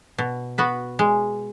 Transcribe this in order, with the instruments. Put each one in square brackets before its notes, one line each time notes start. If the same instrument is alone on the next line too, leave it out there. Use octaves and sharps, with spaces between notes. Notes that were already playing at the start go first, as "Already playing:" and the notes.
[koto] B2
B3 F#4 B4
G#3